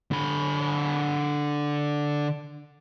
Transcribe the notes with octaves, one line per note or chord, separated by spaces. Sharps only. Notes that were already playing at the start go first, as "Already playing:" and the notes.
D3 B5